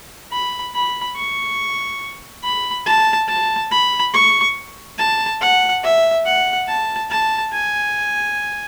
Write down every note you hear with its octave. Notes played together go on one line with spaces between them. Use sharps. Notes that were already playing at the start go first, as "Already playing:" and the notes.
B5
B5
C#6
B5
A5
A5
B5
C#6
A5
F#5
E5
F#5
A5
A5
G#5